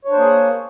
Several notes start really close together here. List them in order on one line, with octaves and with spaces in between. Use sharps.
C#5 D4 C5 A#3 G#4